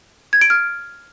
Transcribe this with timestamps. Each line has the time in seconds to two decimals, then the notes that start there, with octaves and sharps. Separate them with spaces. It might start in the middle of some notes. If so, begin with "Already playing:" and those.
0.33 G#6
0.41 D7
0.50 F6